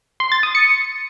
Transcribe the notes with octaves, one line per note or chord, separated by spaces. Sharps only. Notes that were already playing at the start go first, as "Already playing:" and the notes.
C6
A6
D#6
C#7